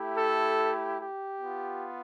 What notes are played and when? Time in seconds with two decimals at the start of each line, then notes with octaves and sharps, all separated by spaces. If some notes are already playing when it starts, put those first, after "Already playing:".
Already playing: A3 E4 G4
0.17 A4
1.00 G4
1.41 B3 F4